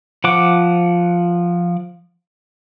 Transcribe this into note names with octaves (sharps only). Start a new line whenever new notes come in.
F3 F#5 D6